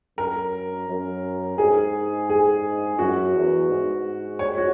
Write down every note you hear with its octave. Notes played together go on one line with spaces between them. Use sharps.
F#2 A#4
F#2
G#2 G#4
G#4
F#2 F#4
E2
G#2
C#5
F#4